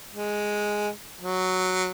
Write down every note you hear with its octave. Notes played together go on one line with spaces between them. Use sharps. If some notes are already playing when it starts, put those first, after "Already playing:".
G#3
F#3